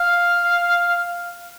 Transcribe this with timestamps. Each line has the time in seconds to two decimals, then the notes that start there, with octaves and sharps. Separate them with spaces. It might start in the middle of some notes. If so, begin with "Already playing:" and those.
Already playing: F5